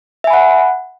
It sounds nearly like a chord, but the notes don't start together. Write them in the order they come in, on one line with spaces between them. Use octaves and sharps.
E5 G#5 B5 F#5